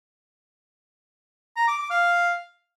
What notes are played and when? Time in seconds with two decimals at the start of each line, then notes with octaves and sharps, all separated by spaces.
1.56 A#5
1.68 D6
1.79 D6
1.90 F5